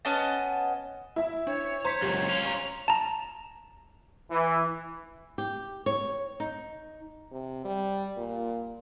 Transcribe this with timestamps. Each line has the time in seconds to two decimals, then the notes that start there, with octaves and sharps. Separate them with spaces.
0.05 B3 C#4 D#5 A5
1.16 E4 E5
1.47 D4 C#5
1.85 C5 A#5 B6 C#7
2.02 C#2 F#2 G4
2.29 C#4 F4
2.46 C#5 A#5
2.88 A5 A#5
4.31 E3
5.38 G4
5.86 C#5
6.40 D#4
7.32 C3
7.65 G3
8.17 A#2